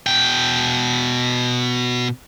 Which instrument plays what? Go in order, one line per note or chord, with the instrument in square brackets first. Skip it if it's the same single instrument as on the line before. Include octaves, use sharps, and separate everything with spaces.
[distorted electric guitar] B2 G5